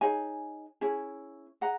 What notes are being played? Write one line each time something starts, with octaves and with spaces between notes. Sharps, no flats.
D#4 G#4 C#5 G#5
C#4 E4 G#4
G#4 D#5 F#5 A#5